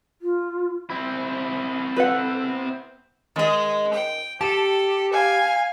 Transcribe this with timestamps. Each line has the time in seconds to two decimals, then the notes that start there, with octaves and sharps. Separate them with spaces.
0.21 F4
0.90 C4 E4 C5
1.96 A4 B4 F#5
2.46 B3
3.36 D#3 G#3 D#5
3.93 G5
4.41 G4 A4 A5
5.13 F5 G#5